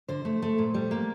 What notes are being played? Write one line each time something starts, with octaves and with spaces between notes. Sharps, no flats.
D3 C5
A3
A3
A#2
G3
A#3